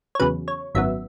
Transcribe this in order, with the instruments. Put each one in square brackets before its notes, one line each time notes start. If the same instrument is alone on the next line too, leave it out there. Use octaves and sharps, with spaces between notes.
[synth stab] C#5
E2 C#3 F#3 B4
C#5
G#1 F#2 F#3 B3 E5